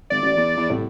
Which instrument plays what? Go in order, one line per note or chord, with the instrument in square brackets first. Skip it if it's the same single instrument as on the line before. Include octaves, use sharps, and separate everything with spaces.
[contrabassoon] G#1 [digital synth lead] D5
[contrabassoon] A1
E2
E2
[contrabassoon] C2 [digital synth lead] A2